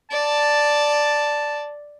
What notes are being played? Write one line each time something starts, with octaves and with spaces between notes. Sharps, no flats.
D5 A5